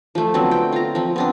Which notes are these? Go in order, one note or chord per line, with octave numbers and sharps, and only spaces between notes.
F3 A3
D3 F#3 B3 C4
G5
F4 A#5
F3 C4
B3 C4 D4